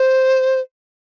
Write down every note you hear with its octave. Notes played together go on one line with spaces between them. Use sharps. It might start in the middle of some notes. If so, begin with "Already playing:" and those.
Already playing: C5